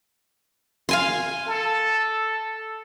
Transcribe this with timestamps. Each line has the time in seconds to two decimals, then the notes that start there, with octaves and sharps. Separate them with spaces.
0.89 F5 G#5 C6
1.47 A4